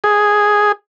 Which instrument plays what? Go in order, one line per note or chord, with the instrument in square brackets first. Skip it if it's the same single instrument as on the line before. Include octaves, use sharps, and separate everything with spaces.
[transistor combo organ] G#4